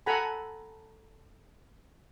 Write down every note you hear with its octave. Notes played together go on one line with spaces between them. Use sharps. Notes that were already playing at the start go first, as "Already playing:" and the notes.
A4 F#5 G#5 A#5 B5